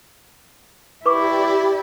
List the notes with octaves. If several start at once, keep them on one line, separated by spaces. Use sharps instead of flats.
E4 G4 B4 D5 C#6 D6